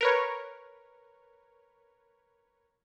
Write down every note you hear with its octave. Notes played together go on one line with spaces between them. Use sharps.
A#4 B4 C#5